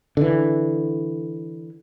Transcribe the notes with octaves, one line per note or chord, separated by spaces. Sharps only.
D3 E3